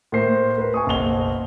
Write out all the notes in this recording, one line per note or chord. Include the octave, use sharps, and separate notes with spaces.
A2 A#3 A#4 C5 C7
A#4 B4
G#5 C#6 D#6
F#1 B1 C5 F7 G7